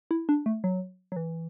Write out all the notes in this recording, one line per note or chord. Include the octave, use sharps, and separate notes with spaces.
E4
D4
A3
F#3
F#3
E3